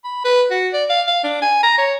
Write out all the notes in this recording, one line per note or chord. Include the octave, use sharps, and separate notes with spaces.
B5
B4
F#4
D5
F5
F5
D4
G#5
A#5
C#5